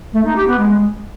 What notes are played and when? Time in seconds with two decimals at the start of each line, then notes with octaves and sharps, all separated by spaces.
0.13 A3
0.24 D#4
0.35 G4
0.47 B3
0.58 G#3